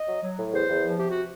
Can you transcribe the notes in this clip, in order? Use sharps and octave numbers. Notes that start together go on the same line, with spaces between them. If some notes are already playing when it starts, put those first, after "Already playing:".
Already playing: D#5
F#3
F#3
A2
E2 C5
E2
F3
C3 G4
F#4